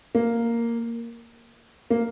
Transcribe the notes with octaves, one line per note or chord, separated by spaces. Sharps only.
A#3
A#3